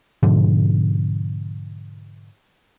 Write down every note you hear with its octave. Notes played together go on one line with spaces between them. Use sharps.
G#2 B2 D3 F3